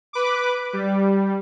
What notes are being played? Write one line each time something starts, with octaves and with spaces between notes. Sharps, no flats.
B4 D6
G3